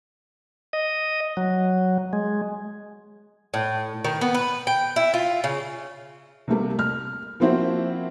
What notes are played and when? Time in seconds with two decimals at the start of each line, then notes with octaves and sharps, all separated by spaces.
0.73 D#5
1.37 F#3
2.13 G#3
3.54 A2
4.05 D#3
4.21 B3
4.35 B4
4.67 G5
4.96 E4
5.14 F4
5.44 C#3
6.48 C3 G3 A3 A#3
6.79 F6
7.40 F3 A#3 C4 E4 F#4 C5